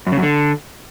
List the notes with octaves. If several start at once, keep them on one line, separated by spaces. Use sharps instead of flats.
F#2
C#3
F#2
D3